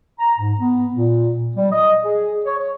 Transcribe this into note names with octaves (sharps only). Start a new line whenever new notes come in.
A#5
G#2
B3
A#2
G3
D#5
G#4
C#5
C#5